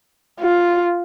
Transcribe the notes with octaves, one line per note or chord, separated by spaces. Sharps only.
F4